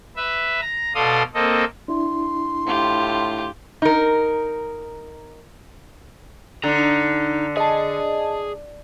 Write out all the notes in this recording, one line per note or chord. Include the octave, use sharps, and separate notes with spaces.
B4 E5
A#5
B2 A4 D5 F5 C6 D#6
A#3 C4 A4 D#5
D4 E4 C6
A2 F4 G4
D#4 A#4
D3 D#4 A#5
G#4 D#5 A5